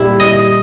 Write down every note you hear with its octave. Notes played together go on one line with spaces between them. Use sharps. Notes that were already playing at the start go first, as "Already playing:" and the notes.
Already playing: A#2 G3 E4 G4
D#5